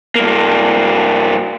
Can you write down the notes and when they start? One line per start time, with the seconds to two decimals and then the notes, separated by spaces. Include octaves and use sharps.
0.16 G2 A#3